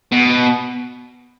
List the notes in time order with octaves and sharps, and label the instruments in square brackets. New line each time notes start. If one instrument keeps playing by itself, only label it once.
[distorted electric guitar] B2